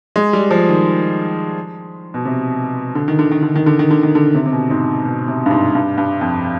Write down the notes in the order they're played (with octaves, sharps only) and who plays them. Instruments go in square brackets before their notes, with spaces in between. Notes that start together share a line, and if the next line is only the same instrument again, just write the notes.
[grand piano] G#3
G3
F3
D#3
B2
C3
D3
D#3
D3
D#3
D3
D#3
D3
D#3
D3
D#3
D3
C3
C3
B2
G#2
B2
C3
G2
G#2
G2
G2
F2